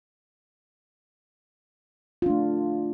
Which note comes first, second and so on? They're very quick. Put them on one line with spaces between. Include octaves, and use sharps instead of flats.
F4 D4 A3